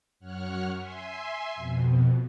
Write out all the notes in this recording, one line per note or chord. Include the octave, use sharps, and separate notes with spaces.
F#2 C#5 F#5 F6 F#6
E5 G#5 C6
F2 B2